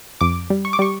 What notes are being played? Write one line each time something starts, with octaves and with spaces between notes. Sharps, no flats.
F2 D6
G3
C#6
D6
G3 C#6